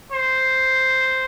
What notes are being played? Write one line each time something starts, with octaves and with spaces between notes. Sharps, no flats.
C5